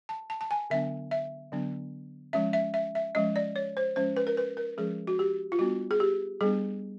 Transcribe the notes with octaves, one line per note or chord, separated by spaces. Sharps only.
A5
A5
A5
G#5
D3 F#3 B3 D4 E5
E5
D3 F#3 B3 D4
F3 G#3 C#4 E5
E5
E5
E5
F3 G#3 C#4 D#5
D5
C#5
C5
F3 G#3 C#4 C5
B4
A#4
B4
A#4
F3 G#3 C#4 G#4
F#4
G4
F4
G3 B3 D4 F#4
G#4
G4
G3 B3 D4 G#4